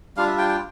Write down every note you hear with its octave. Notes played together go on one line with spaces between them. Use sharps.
G3 D4 F4 F5
E5
G5
G5